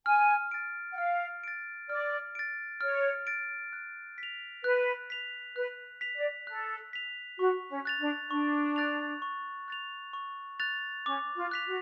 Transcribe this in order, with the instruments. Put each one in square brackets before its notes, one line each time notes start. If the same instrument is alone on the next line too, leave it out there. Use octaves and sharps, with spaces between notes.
[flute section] G#5 [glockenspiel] F6
[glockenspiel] A6 D7
[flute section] F#5
[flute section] F5 [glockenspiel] F6
[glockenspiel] A6 D7
[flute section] D5 [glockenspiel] F6
[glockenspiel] A6 D7
[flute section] C#5 [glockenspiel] F6
[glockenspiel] A6 D7
F#6
B6
F7
[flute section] B4 [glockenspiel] F#6
[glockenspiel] B6 F7
[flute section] B4 [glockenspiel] F#6
[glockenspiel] B6 F7
[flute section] D5
[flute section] A4 [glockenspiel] F#6
[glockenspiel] B6 F7
[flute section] F#4 [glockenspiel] C#6
[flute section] C#4
[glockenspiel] F#6 A6 F7
[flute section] D4
[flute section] D4 [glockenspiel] C#6
[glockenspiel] F#6 A6 F7
C#6
F#6 A6 F7
C#6
F#6 A6 F7
[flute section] C#4 [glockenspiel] D6
[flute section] F4
[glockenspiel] F#6 B6 F7
[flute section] F#4